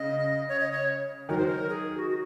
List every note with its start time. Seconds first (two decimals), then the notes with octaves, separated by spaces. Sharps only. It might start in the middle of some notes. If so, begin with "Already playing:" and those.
Already playing: C#3 D#5
0.49 C#5
0.60 D#5
0.72 C#5
1.29 D#3 F#3 A#4
1.38 C5
1.46 A#4
1.70 G#4
1.98 F#4
2.09 F#4